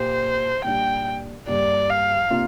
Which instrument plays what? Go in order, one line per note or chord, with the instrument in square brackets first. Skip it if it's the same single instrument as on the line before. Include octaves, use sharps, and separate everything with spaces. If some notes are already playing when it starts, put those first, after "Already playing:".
Already playing: [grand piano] A#2 A#3 G4 [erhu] C5
[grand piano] A#2 G3 D4 G4 [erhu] G5
[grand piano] G2 G3 A#3 G4 [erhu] D5
[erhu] F5
[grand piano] C3 A#3 D4 F4